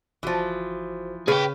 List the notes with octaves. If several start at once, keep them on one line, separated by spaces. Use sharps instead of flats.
G1 E3 F3 F#4 C5
C#3 G#4 B4 G5